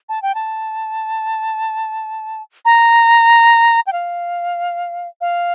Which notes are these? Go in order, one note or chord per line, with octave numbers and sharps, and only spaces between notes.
A5
G5
A5
A#5
G5
F5
F5